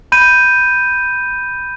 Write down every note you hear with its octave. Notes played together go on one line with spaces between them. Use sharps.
B5 G6 D#7